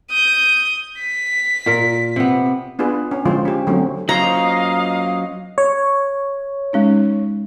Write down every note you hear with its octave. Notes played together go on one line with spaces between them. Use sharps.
D#6 G6
B6
A#2 A#4
C3 B3
B3 D4 F4 G#4 B4
C#4
D3 F3 G#3 F4 C5
C#4 G4
D3 F#3 A3 C4 C#4
F#3 A#3 C#4 F4 C5 D#5 F5 A#5
C#5
G#3 C#4 D#4